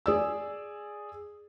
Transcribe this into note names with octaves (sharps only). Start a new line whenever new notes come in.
G#4 D5 E6